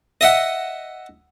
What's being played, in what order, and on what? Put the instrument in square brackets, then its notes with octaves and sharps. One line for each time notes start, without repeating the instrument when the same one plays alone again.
[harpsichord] D#5 E5 F#5